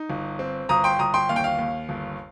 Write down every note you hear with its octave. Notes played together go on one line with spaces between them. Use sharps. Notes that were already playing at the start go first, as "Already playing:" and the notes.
Already playing: D#4
G1
C4
G1 A#5 D#6
G5 C6
G1 A#5 D#6
G5 C6
D#2 F5
G5
F5
D#2
G1